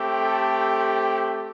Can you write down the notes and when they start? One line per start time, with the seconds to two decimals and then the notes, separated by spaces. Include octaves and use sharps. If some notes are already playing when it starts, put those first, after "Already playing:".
Already playing: A3 C4 G4
0.23 A4